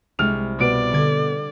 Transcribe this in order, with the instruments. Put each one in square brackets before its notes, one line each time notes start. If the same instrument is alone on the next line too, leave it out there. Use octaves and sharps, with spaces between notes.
[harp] C2 [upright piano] G#3 F6 F7
[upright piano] B2 B4 D7 [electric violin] D5
[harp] D3 G#6